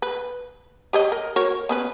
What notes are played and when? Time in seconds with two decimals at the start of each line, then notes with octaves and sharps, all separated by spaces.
0.02 B4
0.93 G4 C#5 D#5
1.12 A#4
1.36 F#4 A#4 C#5
1.69 B3 C#4 B4